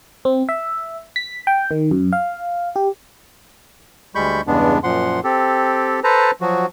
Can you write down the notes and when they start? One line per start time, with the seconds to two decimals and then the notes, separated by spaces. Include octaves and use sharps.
0.25 C4
0.49 E5
1.16 B6
1.47 G5
1.71 D#3
1.91 F#2
2.13 F5
2.76 G4
4.15 D2 G3 G#3 B5 C#6 G6
4.47 E2 G2 C#3 G#3 B3 D4
4.83 F#2 A#2 F3 F#5 C6
5.24 C4 G4 A4
6.04 A4 B4 C5 A5 A#5
6.41 F3 F#3 F#4